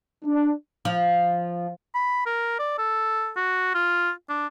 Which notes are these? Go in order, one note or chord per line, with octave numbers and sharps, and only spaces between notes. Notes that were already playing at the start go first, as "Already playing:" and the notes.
D4
F3
B5
A#4
D5
A4
F#4
F4
D4